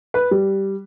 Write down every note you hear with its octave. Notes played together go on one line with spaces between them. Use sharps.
B4
G3